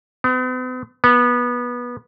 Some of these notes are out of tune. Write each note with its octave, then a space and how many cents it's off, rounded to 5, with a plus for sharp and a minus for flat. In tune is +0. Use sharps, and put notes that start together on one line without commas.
B3 +45
B3 -20